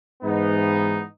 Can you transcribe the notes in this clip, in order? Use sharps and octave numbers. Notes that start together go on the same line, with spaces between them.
G#2 E3 B3 D#4